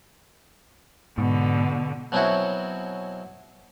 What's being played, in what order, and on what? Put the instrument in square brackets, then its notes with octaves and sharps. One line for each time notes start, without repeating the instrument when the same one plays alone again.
[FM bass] G#2 [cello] B2 D3
[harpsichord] B2 F#3 C4 C#4 E4 F#4